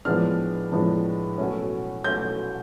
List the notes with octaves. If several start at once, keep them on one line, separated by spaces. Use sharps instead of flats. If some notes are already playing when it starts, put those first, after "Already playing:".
A2 F3 G#3 B3 D4 F6
A2 F3 G#3 B3 D4
B2 F#3 A3 C#4
B2 F#3 A3 C#4 G6